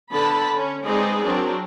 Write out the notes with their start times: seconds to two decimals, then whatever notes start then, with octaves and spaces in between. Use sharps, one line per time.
0.11 D3 B3 A5 B5
0.55 C#4
0.85 G#3 C4 D#4 G#4 B4 D5
1.24 F#3 C4 D4 A#4